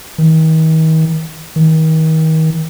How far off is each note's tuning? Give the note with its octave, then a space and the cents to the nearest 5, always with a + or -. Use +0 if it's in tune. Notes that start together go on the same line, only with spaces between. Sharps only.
D#3 +40
D#3 +35